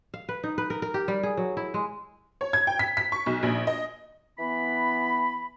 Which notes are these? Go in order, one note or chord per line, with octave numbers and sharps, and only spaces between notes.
F5
B4
D#4
B4
A#4
A#4
G4
G3
G#4
F#3
E4
G#3
C#5
G#6
G5
B6
B6
C#6
B1
A#1
D#5
E3 B3 B5